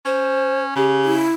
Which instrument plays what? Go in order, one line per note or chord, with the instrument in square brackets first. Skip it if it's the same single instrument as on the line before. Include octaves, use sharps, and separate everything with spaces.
[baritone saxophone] C#4 [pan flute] C5
[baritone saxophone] C#3 [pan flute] G4
[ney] E4